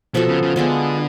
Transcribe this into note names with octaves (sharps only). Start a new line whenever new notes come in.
B2 F3 B3 F#4 A4
C#3
C#3
D3 G#3 B3 D4 F4